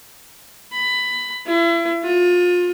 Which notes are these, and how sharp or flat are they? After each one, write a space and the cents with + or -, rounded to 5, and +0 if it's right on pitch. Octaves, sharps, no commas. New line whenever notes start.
B5 +15
E4 +35
F4 +30